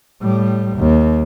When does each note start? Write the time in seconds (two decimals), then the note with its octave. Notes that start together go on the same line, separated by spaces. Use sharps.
0.22 A2 G3
0.78 D#2